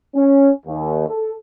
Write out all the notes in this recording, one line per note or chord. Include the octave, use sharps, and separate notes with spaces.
C#4
D#2
A4